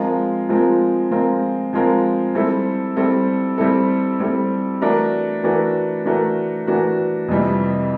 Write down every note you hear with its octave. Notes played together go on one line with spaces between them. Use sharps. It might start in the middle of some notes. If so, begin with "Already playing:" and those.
Already playing: F3 G#3 C4 F4 A#4
F3 G#3 C4 F4 A#4
F3 G#3 C4 F4 A#4
F3 G#3 C4 F4 A#4
G3 C4 E4 A4
G3 C4 E4 A4
G3 C4 E4 A4
G3 C4 E4 A4
E3 A3 D4 F#4 A#4
E3 A3 D4 F#4 A#4
E3 A3 D4 F#4 A#4
E3 A3 D4 F#4 A#4
F2 C3 E3 G3